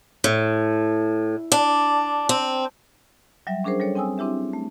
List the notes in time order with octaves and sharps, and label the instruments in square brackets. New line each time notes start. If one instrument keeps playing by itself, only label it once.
[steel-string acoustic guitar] A2
D4
C4
[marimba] F#3 G3 E5
C#4 D4 G#4 A#4 C5
G3 A4 C#5
C4 G5 G#5 D#6 E6
C4 D4 E4 G4 E5
A3